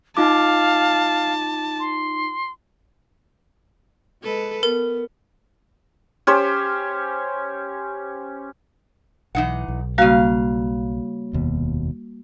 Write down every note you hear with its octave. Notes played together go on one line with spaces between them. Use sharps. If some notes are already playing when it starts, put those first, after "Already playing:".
D#4 F4 F5 A5 D6
C6
G#3 A4 B4
B3 A#4
C#4 G4 C5
B1 E3 D#4 F#5
B1
C#3 G3 A#3 F#4 F5
F1 D#2 B2